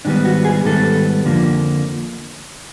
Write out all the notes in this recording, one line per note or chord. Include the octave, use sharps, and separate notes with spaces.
G#2 D#3 G3 B3 D4
F#4
G#4
G#2 D#3 G3 B3 A4
F2 D3 F3 A#3